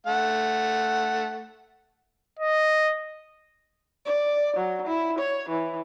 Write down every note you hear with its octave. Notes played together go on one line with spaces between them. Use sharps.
A3 F#5
D#5
D5
F#3
E4
C#5
E3